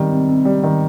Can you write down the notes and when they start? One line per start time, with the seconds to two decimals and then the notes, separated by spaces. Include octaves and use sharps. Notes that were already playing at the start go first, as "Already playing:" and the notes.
Already playing: D#3 G3
0.11 C3
0.28 C3
0.45 G3
0.63 D#3